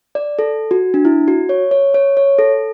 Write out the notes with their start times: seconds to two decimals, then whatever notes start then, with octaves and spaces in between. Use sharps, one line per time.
0.15 D5
0.39 A4
0.71 F#4
0.94 D4
1.05 E4
1.28 F#4
1.49 C#5
1.71 C#5
1.94 C#5
2.17 C#5
2.39 A4